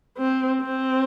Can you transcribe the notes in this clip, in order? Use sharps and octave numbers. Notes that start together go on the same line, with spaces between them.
C4
C4